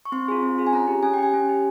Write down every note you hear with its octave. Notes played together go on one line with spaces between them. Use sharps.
C#6
C4 C6
F4 G#4
C4
F4 G#4
G#5
C#4 A#5
G4
C#4 G#5
G5
G4 G#5
C#4
G4